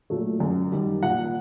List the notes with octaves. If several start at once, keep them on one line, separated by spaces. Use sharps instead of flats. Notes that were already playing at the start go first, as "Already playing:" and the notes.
A#2 F#3 A3
F#2
D#3 G3
A#2 F#5